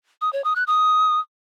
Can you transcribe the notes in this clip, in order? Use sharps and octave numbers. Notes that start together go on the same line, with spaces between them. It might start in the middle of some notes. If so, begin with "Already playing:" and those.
D#6
C#5
D#6
F#6
D#6